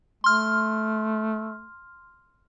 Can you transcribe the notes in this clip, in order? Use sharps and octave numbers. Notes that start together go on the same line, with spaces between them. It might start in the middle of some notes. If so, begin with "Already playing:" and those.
A3 C6 F6